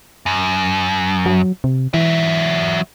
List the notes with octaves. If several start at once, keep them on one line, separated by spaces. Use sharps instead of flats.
F#2
F#3
C3
E3 F#3 E5